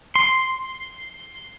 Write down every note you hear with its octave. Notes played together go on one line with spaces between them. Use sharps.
C6